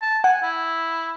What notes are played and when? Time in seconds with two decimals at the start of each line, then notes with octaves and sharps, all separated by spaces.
0.02 A5
0.24 F#5 G#5
0.43 E4